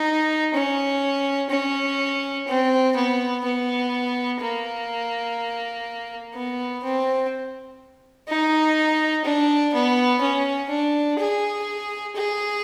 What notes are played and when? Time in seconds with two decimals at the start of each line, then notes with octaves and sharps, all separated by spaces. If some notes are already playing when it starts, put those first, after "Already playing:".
Already playing: D#4
0.54 C#4
1.50 C#4
2.48 C4
2.96 B3
3.44 B3
4.40 A#3
6.35 B3
6.83 C4
8.29 D#4
9.25 D4
9.74 B3
10.21 C#4
10.70 D4
11.19 G#4
12.16 G#4